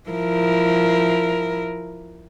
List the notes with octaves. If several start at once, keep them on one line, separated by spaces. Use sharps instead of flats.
F3 E4 A#4